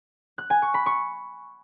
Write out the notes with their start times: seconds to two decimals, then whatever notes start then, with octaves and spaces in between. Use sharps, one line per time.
0.38 F#6
0.50 G#5
0.62 C#6
0.74 B5
0.86 C#6